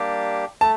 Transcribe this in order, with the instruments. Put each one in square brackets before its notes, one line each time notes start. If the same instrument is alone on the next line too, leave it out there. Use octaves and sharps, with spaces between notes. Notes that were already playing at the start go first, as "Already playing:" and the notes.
Already playing: [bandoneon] G3 A#3 D4 G4
[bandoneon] A3 [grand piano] A5